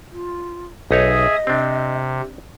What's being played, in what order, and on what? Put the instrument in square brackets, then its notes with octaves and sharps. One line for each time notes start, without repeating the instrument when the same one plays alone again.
[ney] F4
[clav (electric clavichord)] B1 D#4 C#5 [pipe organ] G#4 E5 D#6 [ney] D#5
[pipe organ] C3 [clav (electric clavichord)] C4 D4